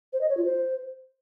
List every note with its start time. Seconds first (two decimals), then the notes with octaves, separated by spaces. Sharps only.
0.13 C5
0.21 D#5
0.29 C#5
0.37 F4
0.45 C5